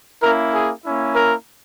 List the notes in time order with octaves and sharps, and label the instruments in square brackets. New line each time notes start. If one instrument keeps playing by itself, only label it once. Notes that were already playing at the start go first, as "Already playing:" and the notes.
[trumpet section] A#3 C#4 E4 A#4
G#4
A#3 C#4 E4
A#4